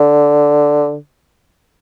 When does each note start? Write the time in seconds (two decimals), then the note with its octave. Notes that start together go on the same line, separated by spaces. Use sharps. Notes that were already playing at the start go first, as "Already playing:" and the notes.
Already playing: D3